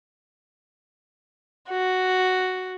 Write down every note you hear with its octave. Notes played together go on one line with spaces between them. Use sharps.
F#4